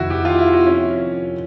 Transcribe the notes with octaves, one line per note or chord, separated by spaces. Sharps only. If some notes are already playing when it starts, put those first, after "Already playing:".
Already playing: F2 C3 D#3 E4 F#4
G4
F4
E4
F#4
C#4